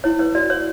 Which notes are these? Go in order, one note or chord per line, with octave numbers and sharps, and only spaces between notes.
E4 C#5
B4 C#5
F#4 D5
C#5